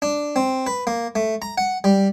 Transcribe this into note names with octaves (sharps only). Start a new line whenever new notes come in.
D4
C4
B4
A#3
A3
A#5
F#5
G3